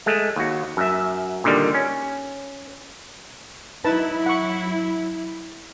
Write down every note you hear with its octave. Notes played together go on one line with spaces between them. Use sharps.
G#3 A3
D#2 F#4
F#2 E5
A#2 D3 D#3 G3
C#4
F#3 D#4 E4 B4 A5
F#5 C#6